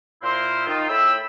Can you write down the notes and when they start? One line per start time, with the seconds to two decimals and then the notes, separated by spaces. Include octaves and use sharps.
0.22 A#2 E4 A#4 C5
0.66 D#3 D#4 F4
0.89 A2 A3 G5 B5 E6